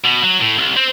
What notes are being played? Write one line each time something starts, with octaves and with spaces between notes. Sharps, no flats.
B2
F#3
A2
C2
C4